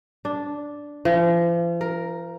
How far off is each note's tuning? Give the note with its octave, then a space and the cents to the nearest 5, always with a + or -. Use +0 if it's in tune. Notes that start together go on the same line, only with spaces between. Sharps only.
D4 -5
F3 -40
A#4 +5